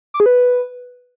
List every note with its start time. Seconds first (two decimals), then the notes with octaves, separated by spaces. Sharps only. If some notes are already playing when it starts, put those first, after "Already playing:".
0.14 D6
0.20 G#4
0.26 B4